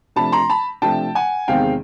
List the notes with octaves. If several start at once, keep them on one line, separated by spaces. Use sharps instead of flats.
C3 F3 A3 D4 A5 B5
A#5 C6
A5 B5
C3 F3 A3 D4 G5 A5
F#5 G#5
E2 C3 D#3 G#3 C4 F5 G5